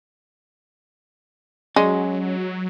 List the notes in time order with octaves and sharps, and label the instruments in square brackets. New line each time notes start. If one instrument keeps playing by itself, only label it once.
[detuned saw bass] F#3 [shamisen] G#3 [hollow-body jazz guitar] C#4 D5